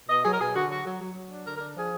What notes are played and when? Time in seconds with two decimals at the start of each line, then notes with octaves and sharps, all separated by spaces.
0.09 B2 D#5
0.24 F#3 G#4
0.32 A#4
0.40 B2 G#4
0.54 D3 F#4
0.69 F#3 F#4
0.85 F#3
1.00 F#3
1.15 F#3
1.30 D4
1.45 D3 A#4
1.55 A#4
1.60 D4
1.76 F3 G#4